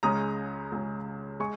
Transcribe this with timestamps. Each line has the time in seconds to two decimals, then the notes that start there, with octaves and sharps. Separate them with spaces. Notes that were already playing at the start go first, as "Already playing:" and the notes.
0.03 C#2 C#3 G#3 C#4 A#5 D#6
0.72 C#2 C#3 G#3 C#4
1.40 G#3 G#5 C#6